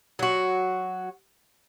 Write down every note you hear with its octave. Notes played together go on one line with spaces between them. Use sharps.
F#3 F#4